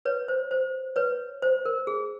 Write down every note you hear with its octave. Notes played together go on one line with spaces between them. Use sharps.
B4 C#5
C5
C5
B4 C#5
C5
A#4
G#4